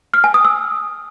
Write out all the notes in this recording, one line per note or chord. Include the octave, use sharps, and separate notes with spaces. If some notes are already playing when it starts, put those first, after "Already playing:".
F6
G#5
D#6
E6